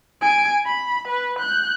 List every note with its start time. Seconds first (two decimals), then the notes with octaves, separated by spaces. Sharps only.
0.21 G#5 D7
0.65 B5
1.08 B4
1.39 F#6 G6